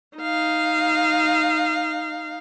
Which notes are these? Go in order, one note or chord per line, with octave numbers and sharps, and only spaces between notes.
D#4 F5